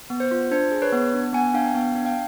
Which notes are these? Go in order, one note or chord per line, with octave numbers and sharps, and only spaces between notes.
B3
C5
F4
D4 C5
G#4
B4 C#5
B3
D4
B3 F#5 G#5
D4 F5 G5
B3 F5 G5
D4
F5 G5